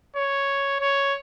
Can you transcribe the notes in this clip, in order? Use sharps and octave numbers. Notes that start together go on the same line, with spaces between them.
C#5
C#5